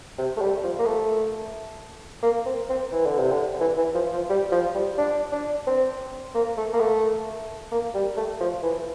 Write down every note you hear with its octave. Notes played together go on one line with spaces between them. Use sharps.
C3
A3
G3
F3
A#3
A3
A#3
C4
C4
E3
D3
C3
D3
E3
E3
F3
F3
G3
F3
G3
D4
D4
C4
A#3
A3
A#3
A3
A#3
G3
A3
F3
E3